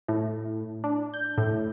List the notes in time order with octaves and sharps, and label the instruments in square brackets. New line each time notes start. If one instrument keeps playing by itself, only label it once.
[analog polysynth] A2
D4
G6
A2